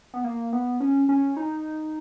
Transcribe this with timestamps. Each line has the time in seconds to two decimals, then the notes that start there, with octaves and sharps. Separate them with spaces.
0.14 B3
0.24 A#3
0.53 B3
0.80 C#4
1.09 C#4
1.37 D#4